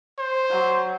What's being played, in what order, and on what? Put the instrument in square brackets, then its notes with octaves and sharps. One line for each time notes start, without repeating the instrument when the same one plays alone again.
[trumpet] C5
[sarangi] F#3